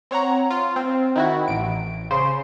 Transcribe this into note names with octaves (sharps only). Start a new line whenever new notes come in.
C4 C#5 F#5 A#5
F4
C4
D#3 E4 F#4
A1 D7
C#3 C5 C6